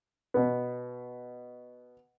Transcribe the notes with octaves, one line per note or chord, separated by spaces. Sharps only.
B2 B3